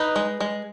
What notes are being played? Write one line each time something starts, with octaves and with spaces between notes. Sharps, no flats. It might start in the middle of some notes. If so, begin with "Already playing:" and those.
Already playing: D#4 B4
G#3
G#3